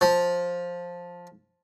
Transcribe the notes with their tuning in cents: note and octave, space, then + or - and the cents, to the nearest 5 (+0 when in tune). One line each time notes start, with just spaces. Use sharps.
F3 +10